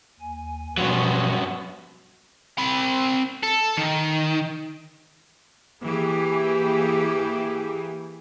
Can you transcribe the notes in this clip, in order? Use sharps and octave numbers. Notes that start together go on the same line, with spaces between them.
D#2 G#5
G2 B2 F3 F#3 B3 F#4 C6
C4 B5
A4
D#3
E3 A#3 E4 G4 G#4